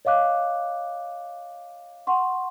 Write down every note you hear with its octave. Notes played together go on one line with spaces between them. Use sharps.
C#5 D#5 F5 D6 F#6
F#5 C6 C#6